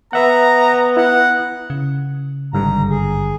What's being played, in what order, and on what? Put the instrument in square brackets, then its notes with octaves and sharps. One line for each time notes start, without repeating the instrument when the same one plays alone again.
[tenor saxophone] B3 [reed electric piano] B4 E5 F#5 [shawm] A#5
[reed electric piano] E4 [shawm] F#5
[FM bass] C#3
[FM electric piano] G#1 G2 D3 [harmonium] A#5
[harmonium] G#4